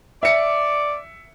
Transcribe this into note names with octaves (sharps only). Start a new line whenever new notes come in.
D5 E5 C#7